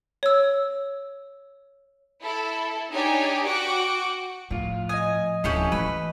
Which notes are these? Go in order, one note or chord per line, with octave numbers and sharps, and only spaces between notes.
C#5 E6
E4 A4
D4 D#4 G4 C#5 G#5
F#4 F#5 G5 C#6 D6
A2 F3 F4
D#5 G#5 D#6
D1 F3 C#4 E4 G4 A4
E3 A3 B4